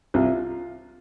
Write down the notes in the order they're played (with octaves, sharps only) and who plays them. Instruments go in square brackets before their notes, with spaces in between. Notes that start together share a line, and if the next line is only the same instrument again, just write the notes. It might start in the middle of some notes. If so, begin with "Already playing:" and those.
[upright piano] C2 F4